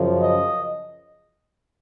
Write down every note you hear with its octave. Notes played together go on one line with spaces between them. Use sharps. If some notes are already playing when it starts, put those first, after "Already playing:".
Already playing: F#2 C#3 F3
D#5